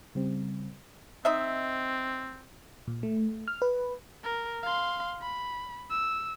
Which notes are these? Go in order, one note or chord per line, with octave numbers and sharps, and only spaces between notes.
C#3 G3 C4
C4 D#4 D#5 E5
A#2
A3
F6
B4
A#4
F5 C6
B5
E6